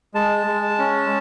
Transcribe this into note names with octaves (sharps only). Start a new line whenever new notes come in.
G#3 A5
G#3
C#4